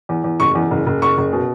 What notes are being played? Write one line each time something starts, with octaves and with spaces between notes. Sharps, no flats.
E2
E2
F#1 C#6
E2
F#1
F#1
F#1 C#6
F#1
B2